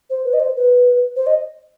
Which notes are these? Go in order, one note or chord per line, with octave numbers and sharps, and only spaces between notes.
C5
B4
D#5
C5
B4
C5
D#5